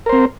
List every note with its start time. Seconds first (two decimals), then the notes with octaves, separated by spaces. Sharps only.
0.06 A#4
0.09 C5
0.12 C4